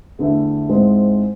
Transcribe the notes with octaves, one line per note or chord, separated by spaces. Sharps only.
E2 D3 A3 E4
G#2 G#3 C4 E4